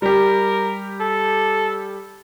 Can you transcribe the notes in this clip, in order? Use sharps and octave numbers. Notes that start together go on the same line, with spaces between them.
G3 G4 A#4
A4